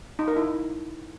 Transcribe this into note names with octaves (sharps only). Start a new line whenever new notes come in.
D#4
A#4
E4